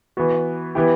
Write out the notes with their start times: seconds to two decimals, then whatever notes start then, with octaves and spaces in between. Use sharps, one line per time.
0.17 E3 B3 F#4
0.75 E3 B3 E4 G4